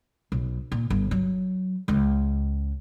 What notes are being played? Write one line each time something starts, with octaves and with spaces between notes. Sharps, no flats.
B1
A#2
G1 G2
F#3
C#2 G#3